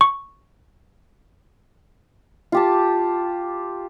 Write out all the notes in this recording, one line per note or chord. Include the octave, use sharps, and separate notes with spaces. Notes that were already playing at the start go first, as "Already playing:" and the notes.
C#6
F4 G4 A5